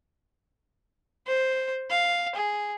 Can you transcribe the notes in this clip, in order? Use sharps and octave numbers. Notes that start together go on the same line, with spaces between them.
C5
F5
G#4